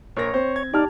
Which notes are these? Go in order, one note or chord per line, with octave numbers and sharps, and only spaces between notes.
A#1 A#4 C#5 A#6
C4 C5
G#6
D#4 G4 D5 A5 F6